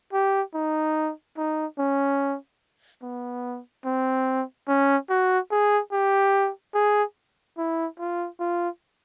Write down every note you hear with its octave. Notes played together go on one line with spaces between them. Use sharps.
G4
D#4
D#4
C#4
B3
C4
C#4
F#4
G#4
G4
G#4
E4
F4
F4